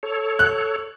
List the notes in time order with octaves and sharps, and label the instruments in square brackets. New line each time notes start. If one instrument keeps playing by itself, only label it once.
[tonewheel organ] A4 C#5
[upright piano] F#6